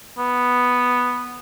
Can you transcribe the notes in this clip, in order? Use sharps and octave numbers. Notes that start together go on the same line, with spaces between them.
B3